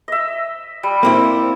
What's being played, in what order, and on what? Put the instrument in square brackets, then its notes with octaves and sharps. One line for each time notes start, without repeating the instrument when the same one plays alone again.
[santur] D#5 E5
G3
[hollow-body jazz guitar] A#3 C4 E4